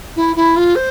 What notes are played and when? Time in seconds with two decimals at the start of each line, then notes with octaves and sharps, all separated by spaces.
0.16 E4
0.35 E4
0.56 F4
0.75 C5